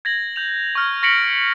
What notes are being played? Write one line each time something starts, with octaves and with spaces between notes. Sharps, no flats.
G#6 A#6 F#7
G6 F7
C#6 F6 G#6
C#6 A#6 B6 C#7 D7 F#7